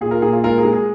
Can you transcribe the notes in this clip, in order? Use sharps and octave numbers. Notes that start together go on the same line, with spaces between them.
A#2 G#4
F4 A#4
A#2 G#4
F4
G#3 F4 A#4
G#4
G#3
G#4